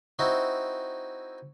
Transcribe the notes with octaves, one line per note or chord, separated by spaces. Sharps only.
C4 D#4 E4 F#4